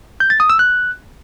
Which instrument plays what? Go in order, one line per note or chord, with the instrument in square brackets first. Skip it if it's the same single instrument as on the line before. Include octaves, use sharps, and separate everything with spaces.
[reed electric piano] G6
A6
D#6
E6
F#6